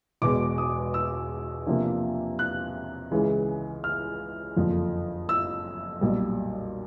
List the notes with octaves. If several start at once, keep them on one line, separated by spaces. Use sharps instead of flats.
E1 E2 B2 G#3 D6
D#6
E6
E2 C3 F3 A#3 D4
F#6
C#2 C#3 E3 G#3
F6
F#1 F2 D3 F3
E6
B1 A#2 G3